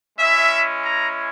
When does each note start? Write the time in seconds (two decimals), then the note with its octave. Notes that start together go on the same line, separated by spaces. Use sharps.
0.19 G#3 C#4 E4 E5
0.84 A#5